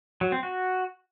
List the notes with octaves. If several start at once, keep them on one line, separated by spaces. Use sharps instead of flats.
F#3
C4
F#4